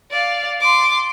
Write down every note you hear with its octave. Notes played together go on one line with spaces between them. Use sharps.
D5 F5
C6 D6